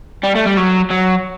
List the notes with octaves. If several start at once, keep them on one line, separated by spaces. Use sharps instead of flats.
G3
A3
G3
F#3
F#3